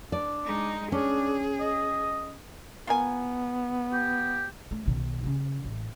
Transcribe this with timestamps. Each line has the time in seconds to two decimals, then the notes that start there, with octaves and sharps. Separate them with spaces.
0.12 D4 D5
0.45 G#3 D#4
0.92 C#4 D4 G#4
1.60 D#5
2.87 B3 F4 A#4 G#5
3.92 G4
4.71 A3
4.86 B1 D#3
5.24 C#3 C#4
5.64 A1